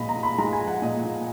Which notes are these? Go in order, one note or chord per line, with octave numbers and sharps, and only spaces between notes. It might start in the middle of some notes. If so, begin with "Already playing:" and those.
Already playing: A#2 F3 G#3 D#5 B5
A#5
A#2
B5
G#3 A#5
G#5
F3
F#5
A#2 D#5
A#2